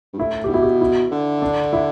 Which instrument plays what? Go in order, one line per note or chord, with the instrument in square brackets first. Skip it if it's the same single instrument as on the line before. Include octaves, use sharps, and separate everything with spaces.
[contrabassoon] G2
[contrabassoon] A2 [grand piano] E4
[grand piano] G4
[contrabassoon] B2 [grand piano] E4
[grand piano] G4
E4
[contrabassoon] D3
[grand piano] D4
E4